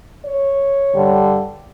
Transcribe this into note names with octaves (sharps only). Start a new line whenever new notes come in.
C#5
G2 D3 G3